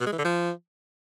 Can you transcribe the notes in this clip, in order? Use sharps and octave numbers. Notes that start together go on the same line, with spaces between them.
B2
G#3
E3
D3
F3